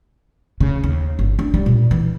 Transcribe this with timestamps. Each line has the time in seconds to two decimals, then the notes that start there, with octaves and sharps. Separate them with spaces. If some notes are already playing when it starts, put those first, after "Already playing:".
0.60 C#3
0.84 D#2
1.19 G1
1.39 D4
1.54 G3
1.66 A#2
1.91 E3